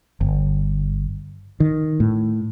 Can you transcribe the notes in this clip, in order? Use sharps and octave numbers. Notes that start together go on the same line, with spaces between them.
G1
D#3
A2